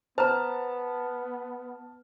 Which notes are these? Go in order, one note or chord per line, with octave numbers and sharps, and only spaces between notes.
B3 C5 A5 A#5 F6